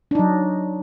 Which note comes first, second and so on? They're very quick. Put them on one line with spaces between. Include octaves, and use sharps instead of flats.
D4 D#4 F#3